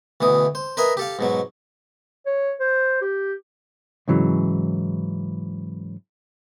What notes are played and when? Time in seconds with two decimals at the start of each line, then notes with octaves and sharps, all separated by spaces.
0.21 D2 B2 E3 D#6
0.55 C5
0.77 A#4 B4 D#5 E5 G#5 A#5
0.97 G4 A4 F5
1.19 G#2 B2 F#3
2.26 C#5
2.60 C5
3.01 G4
4.08 G#2 C#3 E3 F#3